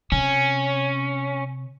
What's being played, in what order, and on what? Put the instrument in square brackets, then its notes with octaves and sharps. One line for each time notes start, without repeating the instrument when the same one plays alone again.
[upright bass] C3 [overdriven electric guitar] C#4